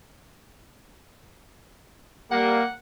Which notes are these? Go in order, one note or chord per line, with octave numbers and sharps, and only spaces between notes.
G3 A#3 F#5